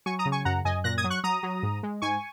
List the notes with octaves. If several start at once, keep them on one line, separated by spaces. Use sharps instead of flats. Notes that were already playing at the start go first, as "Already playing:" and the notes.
F#3 G#5 C#6
A#5 D#6
C#3
G#5 C#6
F#2 F#5 A#5
F#2 D#5 G#5
A#2 F#6 A#6
D#6 G#6
F#3
C#6 F#6
F#3 A#5 D#6
F#3
G#2
G#3
G#2 G#5 C#6